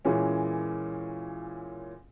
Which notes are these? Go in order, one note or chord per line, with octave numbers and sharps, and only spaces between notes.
A#2 E3 G#3 C#4